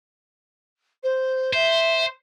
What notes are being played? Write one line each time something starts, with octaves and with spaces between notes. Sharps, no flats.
C5
C5 E5